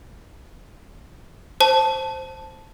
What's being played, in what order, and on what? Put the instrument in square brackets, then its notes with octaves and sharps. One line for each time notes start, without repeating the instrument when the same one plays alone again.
[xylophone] C5 A5